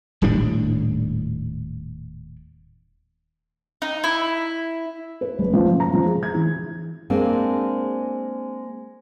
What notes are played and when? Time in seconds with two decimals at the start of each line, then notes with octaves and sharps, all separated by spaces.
0.22 D#1 A2 G3 D4
3.82 D#4
4.04 E4
5.21 B4
5.39 F#1
5.53 F3
5.66 F#2
5.80 A#5
5.93 F3
6.06 G#4
6.23 G#6
6.35 E3
7.10 G#3 A#3 C4 D4